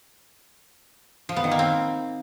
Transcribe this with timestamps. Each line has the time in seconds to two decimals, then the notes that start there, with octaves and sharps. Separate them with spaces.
1.29 F3
1.36 B3
1.44 D#3
1.51 A#3
1.59 C4